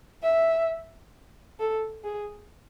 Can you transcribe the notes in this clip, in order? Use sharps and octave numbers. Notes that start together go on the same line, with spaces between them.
E5
A4
G#4